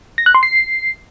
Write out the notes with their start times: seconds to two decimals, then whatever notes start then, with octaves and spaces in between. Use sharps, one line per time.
0.18 A#6
0.26 F#6
0.35 C6
0.43 C7